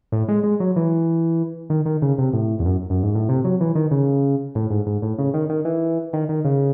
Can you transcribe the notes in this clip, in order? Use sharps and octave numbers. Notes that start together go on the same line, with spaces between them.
A2
G#3
G#3
F#3
E3
D#3
D#3
C#3
C3
A2
E2
F#2
F#2
G#2
A2
C3
F#3
E3
D#3
C#3
A2
G#2
G#2
A2
C#3
D#3
D#3
E3
D#3
D#3
C#3